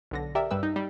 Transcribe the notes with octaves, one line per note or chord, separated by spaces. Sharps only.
B1 D3 A#6
G4 A#4 D5 E5
G2 G3 B4 E6
D#4
G3